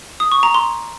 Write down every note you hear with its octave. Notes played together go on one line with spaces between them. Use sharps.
D#6
C#6
A#5
C6